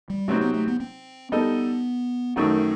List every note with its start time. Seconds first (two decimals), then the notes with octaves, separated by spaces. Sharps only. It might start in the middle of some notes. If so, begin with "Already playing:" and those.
0.10 G3
0.28 C3 F#3 A3 C4 D#4
0.41 B3
0.54 A3
0.67 B3
0.80 C4
1.32 G3 B3 D#4 A4 D#5
2.36 F#2 D#3 A3 C4 D#4 F#4